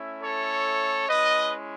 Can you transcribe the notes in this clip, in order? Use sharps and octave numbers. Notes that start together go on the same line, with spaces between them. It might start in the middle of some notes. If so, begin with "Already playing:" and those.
Already playing: A3 C#4 E4
A4 C#5
G#3 C#4 E4 B4 D#5